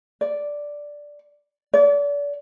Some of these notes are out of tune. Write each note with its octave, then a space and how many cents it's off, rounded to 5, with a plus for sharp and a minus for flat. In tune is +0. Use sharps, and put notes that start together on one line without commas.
D5 -5
D5 -35